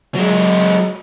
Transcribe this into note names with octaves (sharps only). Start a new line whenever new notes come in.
F#3 G#3